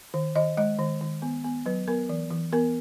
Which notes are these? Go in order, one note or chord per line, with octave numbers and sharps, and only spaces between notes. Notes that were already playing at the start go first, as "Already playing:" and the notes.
D#3
D#3 D#5
G#3 D#5
D#3
D#3
B3
B3
F#3 B4
B3 A#4
E3
E3
B3 A#4